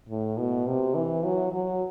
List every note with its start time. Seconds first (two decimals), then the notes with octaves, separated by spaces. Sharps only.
0.09 A2
0.38 B2
0.67 C3
0.95 E3
1.24 F#3
1.53 F#3